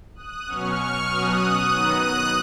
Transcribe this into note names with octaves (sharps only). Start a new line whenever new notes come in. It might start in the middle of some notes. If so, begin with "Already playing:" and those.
D#6 F#6
B2 F#3 C#4 C#6 F6
B2 F#3 C#4 D#6 F#6
D#3 F#3 B3 D#4
D#6 F#6